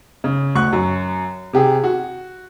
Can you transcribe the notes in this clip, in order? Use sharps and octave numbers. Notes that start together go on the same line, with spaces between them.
C#3
D2 C#6 F#6
F#2
C3 G4 G#4
F#4